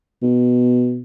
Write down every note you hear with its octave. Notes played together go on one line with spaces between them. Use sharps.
B2